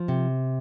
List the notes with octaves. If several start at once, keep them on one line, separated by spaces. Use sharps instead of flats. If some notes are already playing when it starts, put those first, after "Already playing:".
Already playing: F3
C3